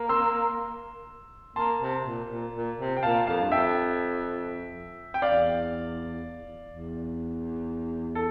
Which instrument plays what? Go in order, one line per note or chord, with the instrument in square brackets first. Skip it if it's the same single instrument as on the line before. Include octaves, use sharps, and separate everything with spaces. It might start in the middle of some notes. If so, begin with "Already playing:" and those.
Already playing: [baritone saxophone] A#3
[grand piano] C6 E6
[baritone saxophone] A#3 [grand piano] A5 C6
[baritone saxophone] C3
A#2
A#2
A#2
C3
[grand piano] G5
[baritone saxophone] A#2 [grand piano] F5 A5
[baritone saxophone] F2 [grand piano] F5 A5
[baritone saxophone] G2
[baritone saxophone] F2 [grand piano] E5 G5
[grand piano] G5
[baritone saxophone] E2 [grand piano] D5 F5
[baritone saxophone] E2
[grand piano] A4